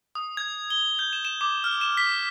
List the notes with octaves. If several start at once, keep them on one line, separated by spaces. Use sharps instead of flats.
D#6
G#6
G7
G6
E7
E7
D6
F6
E7
B6